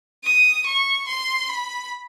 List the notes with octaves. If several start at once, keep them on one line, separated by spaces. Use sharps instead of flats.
D#6
C#6
C6
B5